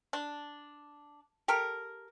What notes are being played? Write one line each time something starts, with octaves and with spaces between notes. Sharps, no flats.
D4
G4 A4 A#4